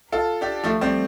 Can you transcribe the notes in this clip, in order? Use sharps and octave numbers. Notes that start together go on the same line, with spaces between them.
F4 A4
D4 G4
F3 A3
G3 C4